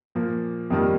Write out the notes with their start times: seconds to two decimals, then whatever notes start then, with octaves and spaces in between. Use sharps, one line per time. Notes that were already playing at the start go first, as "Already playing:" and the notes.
0.15 A#2 F3 A#3
0.70 F2 C3 D#3 G3 A#3